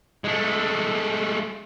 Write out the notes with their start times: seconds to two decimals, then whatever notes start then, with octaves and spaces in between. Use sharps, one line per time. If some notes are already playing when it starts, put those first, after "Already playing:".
0.24 G#3 A3